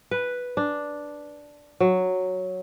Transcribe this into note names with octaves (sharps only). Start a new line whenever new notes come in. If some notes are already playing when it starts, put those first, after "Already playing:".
B4
D4
F#3